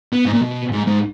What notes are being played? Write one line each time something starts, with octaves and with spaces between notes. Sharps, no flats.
B3
G#2
A#2
B2
G#2
G#2